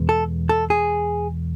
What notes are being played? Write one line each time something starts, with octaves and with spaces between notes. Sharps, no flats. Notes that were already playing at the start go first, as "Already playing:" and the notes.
Already playing: E2 B2 G#3
A4
A4
G#4